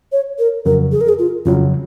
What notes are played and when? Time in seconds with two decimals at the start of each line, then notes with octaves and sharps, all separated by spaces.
0.12 C#5
0.39 A#4
0.65 F2 C#3 F#3 A#4
0.92 G#4
1.01 A#4
1.09 G#4
1.19 F4
1.45 F2 C#3 F#3 F4